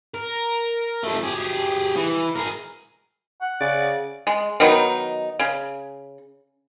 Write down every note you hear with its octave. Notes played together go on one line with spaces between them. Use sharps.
A#4
F3 A3
G4 G#4
E3
G#4 A#4
F#5
C#3 D5
G#3
D#3 F#3 B3 D#4
C#3